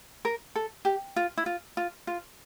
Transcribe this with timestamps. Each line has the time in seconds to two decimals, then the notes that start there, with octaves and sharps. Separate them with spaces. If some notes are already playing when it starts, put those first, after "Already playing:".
0.25 A#4
0.55 A4
0.85 G4
1.16 F4
1.37 E4
1.46 F4
1.77 F4
2.07 F4